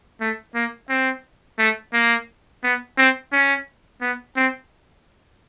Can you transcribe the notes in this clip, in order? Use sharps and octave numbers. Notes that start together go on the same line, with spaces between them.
A3
A#3
C4
A3
A#3
B3
C4
C#4
B3
C4